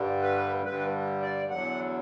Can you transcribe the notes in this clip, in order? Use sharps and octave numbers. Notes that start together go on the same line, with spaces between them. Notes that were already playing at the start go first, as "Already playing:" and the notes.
Already playing: G2 D3 G3
B4
G2 D3 G3 B4
D5
E2 D3 F#3 F#5